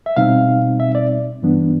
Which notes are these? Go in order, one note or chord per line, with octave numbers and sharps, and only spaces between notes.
E5
B2 G3 C4 D#4 F5
E5
D5
G2 E3 G3 B3 D4